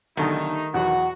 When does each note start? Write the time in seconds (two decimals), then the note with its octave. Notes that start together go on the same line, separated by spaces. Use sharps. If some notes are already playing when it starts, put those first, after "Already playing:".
0.17 B1 D3 D#3 G3 A3 D#4
0.74 E2 B2 F#3 F#4 F#5